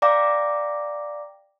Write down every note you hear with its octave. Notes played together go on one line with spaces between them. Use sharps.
D5 F5 G5 A#5 D6 A#6